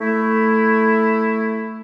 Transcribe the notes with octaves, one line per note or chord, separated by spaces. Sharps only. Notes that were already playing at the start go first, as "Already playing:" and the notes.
A3 E4